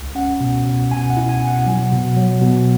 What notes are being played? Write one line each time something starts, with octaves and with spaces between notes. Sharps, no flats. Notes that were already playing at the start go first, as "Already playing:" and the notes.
Already playing: C#2
C#4 F#5
B2
B2
B2 G#5
F#5
E4
G#5
B2
F#5
F#3
B2
F#3
B2